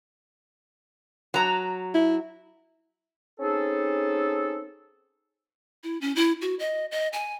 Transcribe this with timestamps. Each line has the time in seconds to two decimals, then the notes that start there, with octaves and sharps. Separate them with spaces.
1.34 F#3 A#5
1.94 E4
3.40 C4 C#4 D#4 G#4 A4
5.83 E4
6.01 C#4
6.16 E4
6.41 F#4
6.59 D#5
6.91 D#5
7.13 G#5